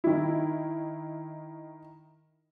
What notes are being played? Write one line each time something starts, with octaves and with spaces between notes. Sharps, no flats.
D#3 E4